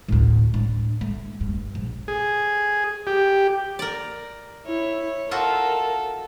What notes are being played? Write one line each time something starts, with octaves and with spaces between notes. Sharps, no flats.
D2 A2
A2 D4
A3
G2
A#1
G#4
G4
A#4 D5
E4 C#5
F4 F#4 A4 A#4 E5